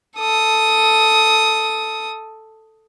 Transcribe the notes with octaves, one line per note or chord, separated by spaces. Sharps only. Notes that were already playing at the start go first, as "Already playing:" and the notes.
A4 D#6